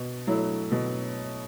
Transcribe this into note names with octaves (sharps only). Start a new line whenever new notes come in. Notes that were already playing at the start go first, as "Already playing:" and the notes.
Already playing: B2
F#3 A3 E4
B2